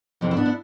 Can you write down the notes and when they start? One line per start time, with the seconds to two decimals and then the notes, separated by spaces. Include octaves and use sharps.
0.21 F2 C3 E3 C4
0.31 E4
0.37 B3 D4
0.46 E4